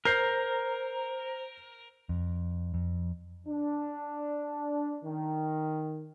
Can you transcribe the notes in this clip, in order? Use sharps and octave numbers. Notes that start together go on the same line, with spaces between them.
A#4 C5 A#5 G6 C7
F2
F2
D4
D#3